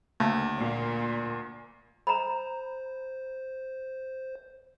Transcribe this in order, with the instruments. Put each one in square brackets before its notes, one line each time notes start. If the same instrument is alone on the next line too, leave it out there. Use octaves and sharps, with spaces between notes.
[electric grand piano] D2 [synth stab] C#3 A3 A#3
[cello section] A#2
[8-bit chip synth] C5 [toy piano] A#5 B5